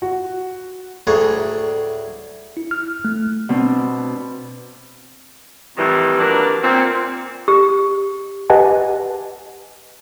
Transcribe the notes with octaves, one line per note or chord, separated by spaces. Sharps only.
F#4
D2 A2 D4 G#4 A#5 C#6
E4
F6
A3
B2 C4 D4
F2 A2 D#3 E3 G3
F#3 A#3 D4 A#4 B4
A#2 C4
G4
G4 B4 D#5 F#5 G#5 A5